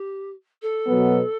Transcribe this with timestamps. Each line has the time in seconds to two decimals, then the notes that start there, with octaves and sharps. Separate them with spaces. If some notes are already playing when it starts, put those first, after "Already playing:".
Already playing: G4
0.62 A4
0.87 B2 F#3 B3